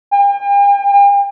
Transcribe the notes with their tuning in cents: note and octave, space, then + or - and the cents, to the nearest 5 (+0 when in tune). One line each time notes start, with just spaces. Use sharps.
G5 +45